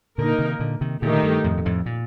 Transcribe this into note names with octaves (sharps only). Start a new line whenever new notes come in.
A#2 D3 A#3 D#4 A#4
C3 D#3
A#2 D3
C3 D#3
A#2 D3 D#3 A3 D#4 G4
G2
F2 A2
A#2
F2 A2
A#2